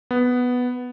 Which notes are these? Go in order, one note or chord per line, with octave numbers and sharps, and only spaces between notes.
B3